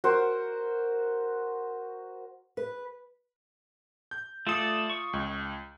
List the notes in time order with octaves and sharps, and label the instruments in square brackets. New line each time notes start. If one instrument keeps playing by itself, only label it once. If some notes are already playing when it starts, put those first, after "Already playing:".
[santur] F#4 A#4 C5
[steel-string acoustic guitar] B4
[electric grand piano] G6
[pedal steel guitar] A3 A4 D5 [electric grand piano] F4 D#6
[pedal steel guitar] C#6
[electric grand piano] C#2